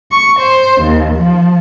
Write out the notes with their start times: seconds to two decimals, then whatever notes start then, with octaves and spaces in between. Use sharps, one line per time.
0.11 C#6
0.40 C5
0.82 D#2
1.15 F3